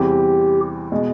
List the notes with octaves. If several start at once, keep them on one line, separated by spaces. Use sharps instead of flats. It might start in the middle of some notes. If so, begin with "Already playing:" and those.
Already playing: E2 C3 E3 G3 C4 G4
B2 G#3